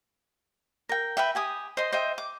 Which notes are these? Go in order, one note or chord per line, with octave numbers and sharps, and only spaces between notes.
A#4 G5
B4 E5 G5
G4 G#5 D#6
C5 D#5 C6
C5 D#5 E5 G5
D6